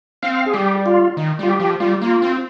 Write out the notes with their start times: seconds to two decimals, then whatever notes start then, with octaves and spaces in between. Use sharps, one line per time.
0.23 C4 F5
0.46 G#4
0.54 G3 G4
0.86 F4
1.17 D#3
1.39 G3 F4
1.49 G4
1.59 F3
1.80 G3 F4
2.02 A#3 F4
2.22 C4